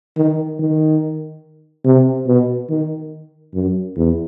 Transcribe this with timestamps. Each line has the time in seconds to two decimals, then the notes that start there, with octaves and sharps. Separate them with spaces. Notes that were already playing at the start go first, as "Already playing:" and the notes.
0.17 D#3
0.59 D#3
1.85 C3
2.27 B2
2.70 D#3
3.54 F#2
3.97 E2